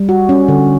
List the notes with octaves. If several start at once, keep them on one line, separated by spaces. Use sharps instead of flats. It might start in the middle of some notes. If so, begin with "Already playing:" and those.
Already playing: G3
F#4
C#4
D3